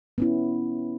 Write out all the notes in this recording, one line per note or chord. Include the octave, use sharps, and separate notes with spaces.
B3 C#4 E4